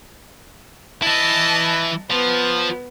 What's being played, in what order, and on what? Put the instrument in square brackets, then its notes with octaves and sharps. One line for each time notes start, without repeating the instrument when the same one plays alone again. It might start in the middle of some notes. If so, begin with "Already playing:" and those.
[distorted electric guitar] E3 E4 [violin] D#5 A5
[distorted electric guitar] F3 [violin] B3